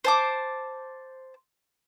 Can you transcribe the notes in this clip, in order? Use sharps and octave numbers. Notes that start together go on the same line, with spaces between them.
C5 A5 D6